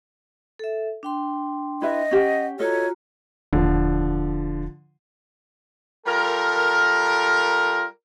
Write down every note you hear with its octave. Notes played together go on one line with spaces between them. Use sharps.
A4 E5
D4 G5 C6
E4 B4 D#5 E5
C#4 G4 F#5 G5
F4 F#4 A4 C#5 D#5 A#5
D#1 D3 F3
G3 F4 A4 A#4